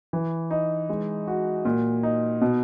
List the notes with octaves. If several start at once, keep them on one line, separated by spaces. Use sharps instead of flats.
E3
D#4
G#3
F#4
A#2
D#4
B2